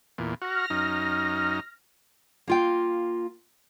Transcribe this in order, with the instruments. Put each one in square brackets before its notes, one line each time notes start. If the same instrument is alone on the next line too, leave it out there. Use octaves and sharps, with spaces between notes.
[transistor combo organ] E2 A#2
[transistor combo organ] F#4 [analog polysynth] F6 A#6
[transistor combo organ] F#2 D#4
[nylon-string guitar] A#3 F4 G5